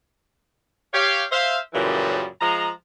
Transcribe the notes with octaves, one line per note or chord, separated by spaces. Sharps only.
G4 C#5 F5
C5 E5 F5
F#2 A#2 C#3 E3 F3 G3
F3 G#3 D#5 A#5